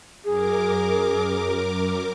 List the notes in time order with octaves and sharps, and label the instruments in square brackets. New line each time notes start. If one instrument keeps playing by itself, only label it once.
[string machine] F#2 A#4 D6 [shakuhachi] G#4